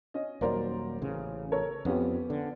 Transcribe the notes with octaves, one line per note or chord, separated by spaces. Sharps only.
C#4 D#5
D#1 D#2 F#3 A#4 C5 D5
A1 C#3
A4 A#4 C#5
F2 B3 C#4 G4
D3